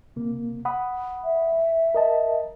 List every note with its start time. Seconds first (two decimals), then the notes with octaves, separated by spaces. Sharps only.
0.16 C3 A#3
0.65 F#5 B5 D#6
1.25 E5
1.94 A#4 D#5 A5